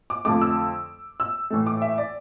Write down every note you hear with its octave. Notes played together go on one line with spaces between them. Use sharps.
D6
F2 D3 F3 A3 D6
E6
E6
A2 E3 A3
D6
E5
D5